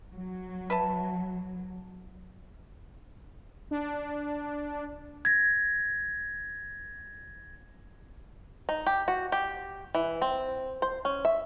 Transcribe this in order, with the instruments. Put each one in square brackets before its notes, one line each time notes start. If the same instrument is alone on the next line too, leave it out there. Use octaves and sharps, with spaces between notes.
[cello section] F#3
[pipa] B4 E5 A5
[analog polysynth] D4
[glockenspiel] G#6 A#6
[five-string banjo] D#4
G4
F#4
G4
E3
C4
C5
C#4
E5